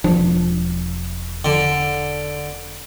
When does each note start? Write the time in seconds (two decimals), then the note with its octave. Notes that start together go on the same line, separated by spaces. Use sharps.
0.04 E1 F3 D4
1.45 D3